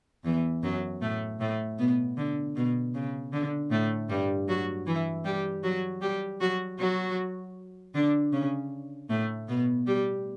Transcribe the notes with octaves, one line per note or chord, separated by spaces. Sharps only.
E2 E3
F#2 F#3
A2 A3
A2 A3
B2 B3
D3
B2
C#3
D3
A2 A3
G2 G3
F#3 F#4
E3 E4
G3 G4
F#3 F#4
G3 G4
F#3 F#4
F#3 F#4
D3 D4
C#3 C#4
A2 A3
B2 B3
G3 G4